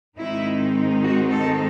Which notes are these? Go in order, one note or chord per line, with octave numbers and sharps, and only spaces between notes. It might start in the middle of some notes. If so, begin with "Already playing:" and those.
G#2 D#3 G#3 C4 D#4 E4
F#4
A4